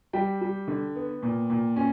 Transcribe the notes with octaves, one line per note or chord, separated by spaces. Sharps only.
G3 G5
G3
D3
B3
A#2
A#2
C#4